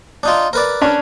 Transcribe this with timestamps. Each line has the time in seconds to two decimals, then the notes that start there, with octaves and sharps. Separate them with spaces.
0.23 D4 D#4 F4
0.53 A#4 B4 D5
0.81 C#4 D4 C#5